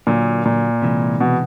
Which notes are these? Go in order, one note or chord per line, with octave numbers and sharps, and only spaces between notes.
A#2 D3 F#3 A#3
A#2
C3 E3 G#3
B2